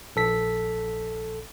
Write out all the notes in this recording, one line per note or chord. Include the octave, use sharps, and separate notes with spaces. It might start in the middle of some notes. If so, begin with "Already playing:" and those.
A#1 A4 B6